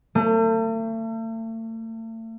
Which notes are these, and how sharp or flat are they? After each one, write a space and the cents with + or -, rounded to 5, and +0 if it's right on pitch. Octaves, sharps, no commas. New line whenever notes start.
A3 +40